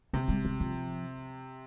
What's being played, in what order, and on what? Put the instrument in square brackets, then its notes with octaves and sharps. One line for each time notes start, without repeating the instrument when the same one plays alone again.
[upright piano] C3 [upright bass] A3
[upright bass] G3
G3
F3